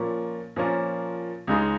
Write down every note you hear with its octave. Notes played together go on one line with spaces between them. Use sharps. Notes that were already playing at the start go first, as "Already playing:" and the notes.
Already playing: A#2 F3 A#3 C#4
A#2 F3 A#3 C#4
C#2 C#3 G#3 D#4